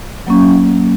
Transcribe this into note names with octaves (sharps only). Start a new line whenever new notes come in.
F#3 A#3 C#4